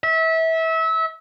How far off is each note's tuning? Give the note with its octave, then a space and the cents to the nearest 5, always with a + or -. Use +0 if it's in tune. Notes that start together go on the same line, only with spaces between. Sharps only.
E5 -25